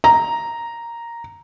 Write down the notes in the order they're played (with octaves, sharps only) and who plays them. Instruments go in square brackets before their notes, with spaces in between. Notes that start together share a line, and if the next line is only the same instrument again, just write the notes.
[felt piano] A#5